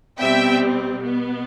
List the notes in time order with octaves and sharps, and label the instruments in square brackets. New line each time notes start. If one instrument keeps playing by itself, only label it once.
[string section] B2 G3 C4 E5 G5
B2 B3